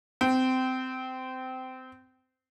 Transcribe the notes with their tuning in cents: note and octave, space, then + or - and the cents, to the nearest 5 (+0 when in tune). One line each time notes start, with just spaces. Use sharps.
C4 -20